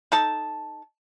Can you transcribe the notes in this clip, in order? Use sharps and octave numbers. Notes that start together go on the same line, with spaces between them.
D#4 A4 A5